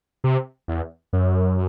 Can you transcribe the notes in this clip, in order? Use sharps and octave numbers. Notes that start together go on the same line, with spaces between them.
C3
E2
F#2